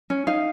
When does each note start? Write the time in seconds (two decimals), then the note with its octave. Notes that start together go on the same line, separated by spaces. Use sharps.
0.10 C#4
0.27 D#4 F5